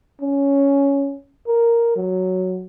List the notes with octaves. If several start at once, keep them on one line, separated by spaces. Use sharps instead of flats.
C#4
A#4
F#3